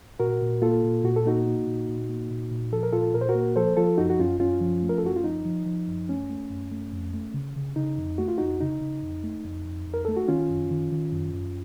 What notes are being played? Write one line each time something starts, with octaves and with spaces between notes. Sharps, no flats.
A#2 F#4 A#4
A#2
A#3 F4 A4
A#2
A#2 F#4
A4
A#3 D#4 F#4
A#3
A#2
A#2
A#3
A#2
A#2
F3 A4
A#4
A#2 F4 A4
A#2 A#4
C5
F#4 A#4
A#3
F3 A4 C5
F3 F4 A4
F#2 D#4 F#4
F#4
F#2 C#4 F4
F#2 C#4 F4
F3
A3
A#4
A4
F#2 F#4
F4
F3 D#4
F3
F3
F#2
A3 C#4
A3
F#2
A3
F2
A3
C#3
C#3
C#3 D#4
F2
A3 F#4
F4
F2 D#4 F#4
C#3 D#4
C#3
F2
A3
F2
F2
F2
A#4
A3 A4
F#4
D#3 C#4 F4
F#2
D#3
D#3
F#2
F#2